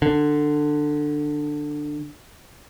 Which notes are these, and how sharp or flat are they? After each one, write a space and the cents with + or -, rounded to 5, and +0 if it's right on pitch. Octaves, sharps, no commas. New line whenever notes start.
D3 +15